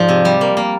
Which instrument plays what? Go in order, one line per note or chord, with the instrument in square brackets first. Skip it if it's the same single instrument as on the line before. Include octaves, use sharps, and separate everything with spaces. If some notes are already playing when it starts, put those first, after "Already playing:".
Already playing: [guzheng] G#2 F3 [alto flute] D5
[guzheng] C3
G3
A#3
A#3